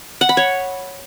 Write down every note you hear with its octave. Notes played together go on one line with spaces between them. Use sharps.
F#5
B5
C#5